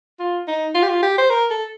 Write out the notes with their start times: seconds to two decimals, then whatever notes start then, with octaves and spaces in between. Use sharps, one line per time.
0.20 F4
0.48 D#4
0.75 F4
0.82 G4
0.89 F4
1.02 G4
1.18 C5
1.30 A#4
1.50 A4